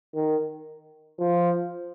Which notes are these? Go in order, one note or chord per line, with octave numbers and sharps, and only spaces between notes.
D#3
F3